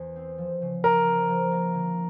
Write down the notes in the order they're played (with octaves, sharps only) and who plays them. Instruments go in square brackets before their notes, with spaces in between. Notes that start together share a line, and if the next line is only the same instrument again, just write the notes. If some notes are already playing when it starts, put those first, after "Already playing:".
Already playing: [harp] E2 E3 [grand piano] C5
[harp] C4
F3
C#3
[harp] A3 [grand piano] A#4
[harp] C4
F3
A#3
D3